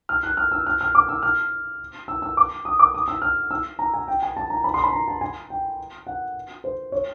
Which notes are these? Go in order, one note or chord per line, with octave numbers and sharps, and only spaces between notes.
F6
F#6
F6
E6
F6
F6
D6
E6
F6
E6
E6
D6
D#6
D6
D#6
E6
F6
E6
A#5
G#5
G5
G#5
A5
A#5
B5
C6
B5
A#5
A5
G#5
G5
F#5
C5
C#5